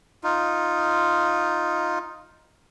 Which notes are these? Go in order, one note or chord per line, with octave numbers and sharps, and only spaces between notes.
D#4 F4